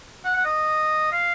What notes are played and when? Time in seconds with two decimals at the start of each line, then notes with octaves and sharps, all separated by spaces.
0.24 F#5
0.35 F#5
0.45 D#5
1.12 F5